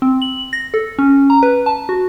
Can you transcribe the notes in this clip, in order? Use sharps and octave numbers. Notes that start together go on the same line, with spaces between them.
C4
F#7
A#6
A4
C#4
A#5
B4
A5
F#4